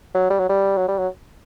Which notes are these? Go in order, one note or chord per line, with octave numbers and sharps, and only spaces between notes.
F#3
G3
F#3
G3
F#3
G3
F#3